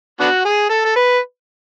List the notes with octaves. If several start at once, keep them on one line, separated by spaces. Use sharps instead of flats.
B3 D4 F#4
G#4
A4
A4
B4